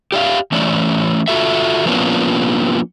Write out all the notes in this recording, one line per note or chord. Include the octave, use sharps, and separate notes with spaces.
G4 D5 E5 F5
E3 A3 C#4 D5
F4 F#4 A4 E5
F3 A#3 B3 C#4 D4 F4